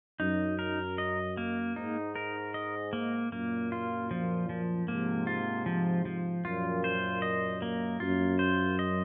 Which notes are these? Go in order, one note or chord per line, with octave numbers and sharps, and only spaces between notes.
F#2 D#4
A#4
D#5
A#3
G#2 D#4
A#4
D#5
A#3
F#2 A#2 A#3
F4
F3
F3
G#2 C3 A#3
F4
F3
F3
F#2 A#2 F4
C5
D#5
A#3
F#2 F4
C5
D#5